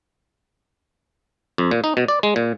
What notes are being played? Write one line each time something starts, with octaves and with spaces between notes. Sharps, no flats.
F2
A#2
D#4
B2
D5
G#3
A#2